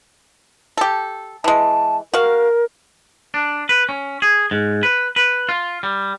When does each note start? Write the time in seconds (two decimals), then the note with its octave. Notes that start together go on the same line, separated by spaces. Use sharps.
0.77 G4 A4
1.44 E3 G#3 A5
2.14 F#4 A#4 F5
3.34 D4
3.69 B4
3.89 C#4
4.22 G#4
4.51 G#2
4.83 B4
5.16 B4
5.49 F4
5.83 G3